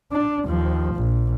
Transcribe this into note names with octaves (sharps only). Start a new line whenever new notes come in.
D4
D#2 F3
A#1